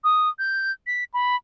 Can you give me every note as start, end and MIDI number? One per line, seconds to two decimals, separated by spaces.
0.04 0.29 87
0.39 0.72 91
0.87 1.04 95
1.14 1.36 83